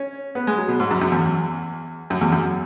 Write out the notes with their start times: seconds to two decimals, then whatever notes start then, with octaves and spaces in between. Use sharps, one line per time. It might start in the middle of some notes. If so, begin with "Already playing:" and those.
Already playing: C#4
0.35 B3
0.47 G#3
0.58 F#3
0.68 B2
0.80 G#2
0.91 F#2
1.01 F#2
1.12 E2
2.10 F#2
2.21 E2
2.32 F#2